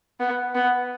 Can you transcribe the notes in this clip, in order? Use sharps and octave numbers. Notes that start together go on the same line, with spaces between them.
B3
B3